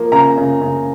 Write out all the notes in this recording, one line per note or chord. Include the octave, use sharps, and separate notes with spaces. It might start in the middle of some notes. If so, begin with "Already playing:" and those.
Already playing: F3 A#3
C#3 A#5
C#3
C#3